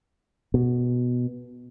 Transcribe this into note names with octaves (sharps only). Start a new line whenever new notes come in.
B2